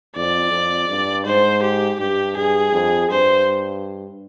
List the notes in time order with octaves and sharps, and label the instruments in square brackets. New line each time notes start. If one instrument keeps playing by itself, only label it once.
[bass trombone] F2 [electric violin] D5
[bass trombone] F2
G2
[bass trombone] G#2 [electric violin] C5
[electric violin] G4
[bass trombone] G2 [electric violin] G4
[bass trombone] G2 [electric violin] G#4
[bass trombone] F2
[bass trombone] G2 [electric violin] C5